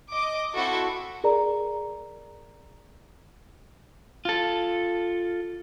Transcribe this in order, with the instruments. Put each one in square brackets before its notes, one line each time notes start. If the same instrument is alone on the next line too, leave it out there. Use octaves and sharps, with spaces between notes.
[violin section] D#5 D6
C4 E4 F#4 A4
[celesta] G#4 A#4 D5 A#5
[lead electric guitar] F4 A4